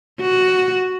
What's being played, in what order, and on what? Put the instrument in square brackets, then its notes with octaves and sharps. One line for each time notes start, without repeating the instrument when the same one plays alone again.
[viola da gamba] F#4